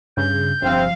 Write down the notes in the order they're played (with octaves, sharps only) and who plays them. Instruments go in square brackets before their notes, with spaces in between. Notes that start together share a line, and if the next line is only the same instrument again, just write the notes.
[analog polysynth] G2 C#3 [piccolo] G6
[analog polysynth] G1 [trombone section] C3 C4 [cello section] F3 F5